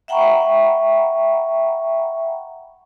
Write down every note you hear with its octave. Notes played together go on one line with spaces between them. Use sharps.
E5 F#5 G5 A#5 B5 C#6